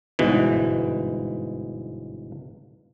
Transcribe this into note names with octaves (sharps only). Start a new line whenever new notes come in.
G1 G#2 B2 E3